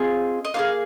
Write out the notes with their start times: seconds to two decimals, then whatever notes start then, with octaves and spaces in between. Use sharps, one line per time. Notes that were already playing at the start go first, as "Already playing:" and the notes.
Already playing: C4 F4 G#4 D#5
0.45 D#5
0.54 A#3 F4 G#4 F5